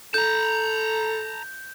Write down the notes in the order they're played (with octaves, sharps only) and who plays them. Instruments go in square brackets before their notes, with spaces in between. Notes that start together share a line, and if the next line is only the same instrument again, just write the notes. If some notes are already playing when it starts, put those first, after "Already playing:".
[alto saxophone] A4 [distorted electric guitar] A5 A#5 [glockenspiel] G6